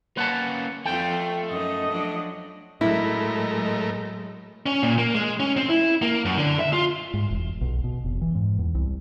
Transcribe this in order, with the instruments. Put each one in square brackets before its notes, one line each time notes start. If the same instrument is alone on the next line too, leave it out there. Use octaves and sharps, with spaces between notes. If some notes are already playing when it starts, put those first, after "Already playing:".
[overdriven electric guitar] A#3 C#4 [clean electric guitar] B4 F#5 A5
[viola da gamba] F2 F4 [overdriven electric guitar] A3 [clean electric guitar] G5
[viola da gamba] F#2 D#4 [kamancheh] D#5
[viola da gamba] F3 F#3 D4
[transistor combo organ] A2 A3 A#4 [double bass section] F#3 G#3 [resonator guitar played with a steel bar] E4
[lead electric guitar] C#4
A#2
A#3
G#3
C#4
C4
E4
A#3
F#2
D3
E5
F4
[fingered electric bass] G#2
E1
B1
B2
F1
E3
G#2
E2
C2